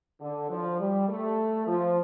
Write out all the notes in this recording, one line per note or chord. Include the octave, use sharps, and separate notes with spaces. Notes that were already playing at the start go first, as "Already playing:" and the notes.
D3
F3
G3
A3
F3